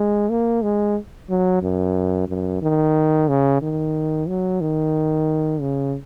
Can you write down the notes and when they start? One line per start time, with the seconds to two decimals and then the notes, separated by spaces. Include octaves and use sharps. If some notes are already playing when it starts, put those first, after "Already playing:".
Already playing: G#3
0.29 A#3
0.62 G#3
1.29 F#3
1.62 F#2
2.28 F#2
2.62 D#3
3.28 C#3
3.62 D#3
4.28 F#3
4.61 D#3
5.61 C#3